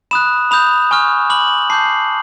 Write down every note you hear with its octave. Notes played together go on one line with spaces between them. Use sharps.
B5 D#6 F#6 E7
B5 D#6 G6 F7
G#5 C#6 F6
B5 D6 F6 F#7
A5 D6 G6 C7